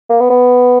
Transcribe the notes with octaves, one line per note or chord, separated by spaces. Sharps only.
A#3
B3
B3